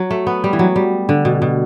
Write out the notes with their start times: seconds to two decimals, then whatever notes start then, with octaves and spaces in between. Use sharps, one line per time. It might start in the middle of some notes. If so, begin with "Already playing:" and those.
Already playing: F#3
0.11 A3
0.27 B3
0.44 G3
0.53 E3
0.59 F#3
0.76 G3
1.09 D3
1.25 B2
1.42 B2